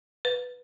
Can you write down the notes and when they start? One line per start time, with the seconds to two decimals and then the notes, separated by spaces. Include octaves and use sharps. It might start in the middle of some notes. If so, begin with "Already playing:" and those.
0.25 B4